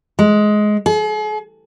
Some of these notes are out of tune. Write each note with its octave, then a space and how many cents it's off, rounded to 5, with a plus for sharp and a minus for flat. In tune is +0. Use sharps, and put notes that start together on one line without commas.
G#3 +15
G#4 +45